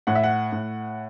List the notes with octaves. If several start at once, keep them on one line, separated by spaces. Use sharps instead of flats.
A2 F#5
E5
F#5
A2